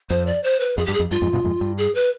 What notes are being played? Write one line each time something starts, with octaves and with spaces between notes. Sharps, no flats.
F2 C5
D5
C5
B4
F2 G#4
G2 G4
G#4
F2
G2 F4
F2 G#2
G2 B2
F2 G#2
G2
G#4
B4